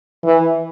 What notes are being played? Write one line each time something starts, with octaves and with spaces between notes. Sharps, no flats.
E3